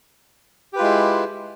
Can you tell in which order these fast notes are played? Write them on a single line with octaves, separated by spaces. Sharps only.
G4 B4 F4 G#3 E4